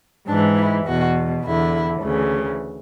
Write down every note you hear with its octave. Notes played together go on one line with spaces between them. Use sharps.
G#2 E3 D4
E4
E2 B2 F#4
E2 D3 E4
D2 C#3 E3